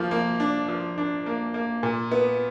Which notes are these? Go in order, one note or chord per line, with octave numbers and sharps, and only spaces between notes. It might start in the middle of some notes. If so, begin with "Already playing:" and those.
Already playing: F3 A#3
A#3
D4
F3
D4
A#3
A#3
A#2
B3